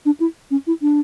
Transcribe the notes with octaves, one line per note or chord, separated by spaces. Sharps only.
D4
E4
C#4
E4
D4